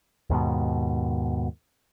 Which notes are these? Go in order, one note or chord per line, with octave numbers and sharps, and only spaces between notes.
D#2 G#2 B2